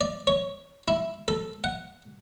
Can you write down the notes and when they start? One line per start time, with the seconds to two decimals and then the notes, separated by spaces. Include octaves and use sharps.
0.01 D5
0.27 C#5
0.88 E4
1.28 A4
1.64 F#5